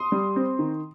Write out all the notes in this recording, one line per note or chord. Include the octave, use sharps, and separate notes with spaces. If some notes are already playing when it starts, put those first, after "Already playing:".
Already playing: C6 D#6
G3
C4
D#3